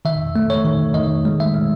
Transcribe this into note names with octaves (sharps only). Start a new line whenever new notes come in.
D#3 E5
A3
C#5
D#3
D#3 D#5
G#3
E5
G#3